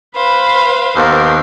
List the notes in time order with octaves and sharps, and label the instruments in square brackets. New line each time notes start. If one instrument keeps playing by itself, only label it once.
[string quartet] B4 C5 F5 [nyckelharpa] B5
[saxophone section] D#2 B3 C5 [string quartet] A#4